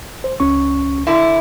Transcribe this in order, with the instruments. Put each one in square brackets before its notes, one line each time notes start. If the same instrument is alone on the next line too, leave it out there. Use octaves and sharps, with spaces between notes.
[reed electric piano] C5
C#2 C#4 C#6
[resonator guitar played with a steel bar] D3 E4